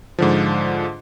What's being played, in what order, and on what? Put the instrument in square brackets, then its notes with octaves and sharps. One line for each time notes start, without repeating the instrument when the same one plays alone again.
[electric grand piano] G#2 D3 F3